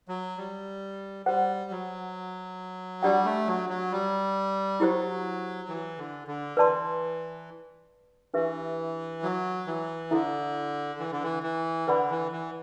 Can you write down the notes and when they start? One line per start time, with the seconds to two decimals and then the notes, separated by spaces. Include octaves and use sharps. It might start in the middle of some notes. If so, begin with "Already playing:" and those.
0.08 F#3
0.37 G3
1.26 G3 F#4 C5 F#5
1.71 F#3
3.03 G3 D4 G4 D5 F#5
3.25 A3
3.47 F#3
3.70 F#3
3.92 G3
4.80 F#3 E4 G4 C5
5.69 E3
5.98 D3
6.28 D3
6.57 E3 B4 D5 A5 C6
8.34 E3 D4 G4 B4 E5
9.23 F#3
9.67 E3
10.11 D3 E4 A4 E5
11.00 E3
11.12 D3
11.23 E3
11.43 E3
11.88 D3 B4 D5 F#5 B5
12.10 E3
12.32 E3